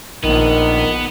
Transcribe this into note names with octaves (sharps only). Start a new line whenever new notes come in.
A#1 D#3 B3